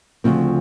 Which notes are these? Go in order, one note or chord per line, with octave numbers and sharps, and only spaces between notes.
D2 C#3 F3 C4